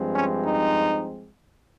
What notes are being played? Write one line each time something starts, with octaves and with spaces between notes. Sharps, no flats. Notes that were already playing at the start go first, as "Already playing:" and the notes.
Already playing: G2 F3 G#3 C4
C#4
D#4